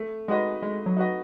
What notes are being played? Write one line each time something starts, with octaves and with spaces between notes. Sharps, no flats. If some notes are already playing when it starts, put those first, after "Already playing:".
Already playing: A3
G#3 D#4 F#4 B4 D#5
G#3 A3
F#3
D#4 F#4 B4 D#5